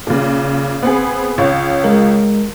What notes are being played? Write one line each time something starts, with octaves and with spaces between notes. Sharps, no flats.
A#2 C#3
B3 C4 G#4
C#2 C#5
G#3 A#4